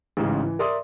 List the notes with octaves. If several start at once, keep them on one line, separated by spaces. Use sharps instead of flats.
A1 G#2 C#3 E3
E3
A#4 D5 E5 C6 D#6